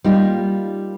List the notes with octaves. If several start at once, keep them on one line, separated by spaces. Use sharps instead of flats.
G3 A#3 D#4 F4 G4